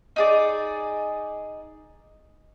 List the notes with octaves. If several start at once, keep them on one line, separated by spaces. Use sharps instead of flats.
D#4 G#4 D5